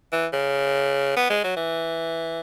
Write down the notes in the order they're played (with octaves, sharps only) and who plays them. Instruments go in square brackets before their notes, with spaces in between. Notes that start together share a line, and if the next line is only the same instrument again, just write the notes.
[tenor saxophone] E3
C#3
B3
G#3
F#3
E3